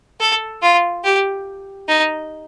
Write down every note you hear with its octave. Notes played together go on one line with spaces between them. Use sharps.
A4
F4
G4
D#4